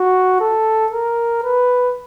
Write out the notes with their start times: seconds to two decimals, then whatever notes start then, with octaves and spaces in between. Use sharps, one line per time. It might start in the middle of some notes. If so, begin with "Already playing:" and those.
Already playing: F#4
0.41 A4
0.92 A#4
1.43 B4